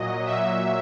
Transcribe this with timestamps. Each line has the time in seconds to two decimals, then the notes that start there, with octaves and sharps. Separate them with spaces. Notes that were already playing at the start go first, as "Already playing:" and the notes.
Already playing: A#2 F#3 D#5
0.26 A#2 F#3 E5